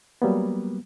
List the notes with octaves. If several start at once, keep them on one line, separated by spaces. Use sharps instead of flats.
F#3 G3 A#3 B3